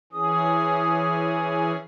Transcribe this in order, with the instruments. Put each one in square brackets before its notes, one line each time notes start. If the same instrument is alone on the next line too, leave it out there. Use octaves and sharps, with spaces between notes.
[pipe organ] E3 C#4 G#4 [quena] D#6